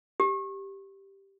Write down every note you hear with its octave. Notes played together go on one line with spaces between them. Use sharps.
G4